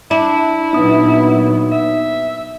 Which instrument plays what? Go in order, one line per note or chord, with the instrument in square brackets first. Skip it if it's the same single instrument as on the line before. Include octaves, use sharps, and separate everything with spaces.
[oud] D4 [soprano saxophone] E4
[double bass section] A#2 F#3 B3 [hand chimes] D#4 D#6
[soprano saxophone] E5